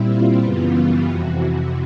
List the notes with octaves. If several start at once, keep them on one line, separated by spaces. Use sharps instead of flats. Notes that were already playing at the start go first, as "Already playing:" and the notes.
Already playing: A#2 G3 C4 E4
F4
F#2 C#3 E3 G3 B3
F2 C3 E3 F#4
F#4